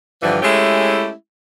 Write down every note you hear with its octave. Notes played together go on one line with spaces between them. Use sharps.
G2 D3 E3 F3
G#3 A3 C#4 E4 G4